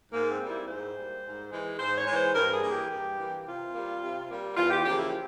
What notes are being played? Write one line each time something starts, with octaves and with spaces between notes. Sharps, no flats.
G#2 A#3
C4
G3 A#3
E4
G#2 C5
G3 A#3
G#2
E3 G#3
G#2 C5
C#5
E3 G#3
C5
G2 A#4
G#4
E3 A#3
G4
G2
E3 A#3
C3 F4
G3 A#3
C3
G3 A#3
E2 F4
G4
C#3 F3 A#3 G4
E4
G4